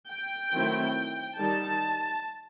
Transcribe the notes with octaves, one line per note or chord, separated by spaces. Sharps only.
G5
D#3 F#3 A3 C4 E4
D#3 G3 D#4 A5